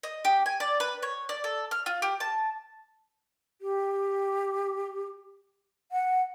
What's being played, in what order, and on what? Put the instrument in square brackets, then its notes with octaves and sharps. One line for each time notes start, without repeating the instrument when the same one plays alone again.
[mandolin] D#5
G4
G#5
D5
B4
C#5
D5
A4
F6
F4
G4
A5
[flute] G4
F#5